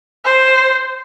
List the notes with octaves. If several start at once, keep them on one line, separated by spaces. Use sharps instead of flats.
C5